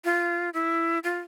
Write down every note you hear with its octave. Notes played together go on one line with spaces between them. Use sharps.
F4
E4
F4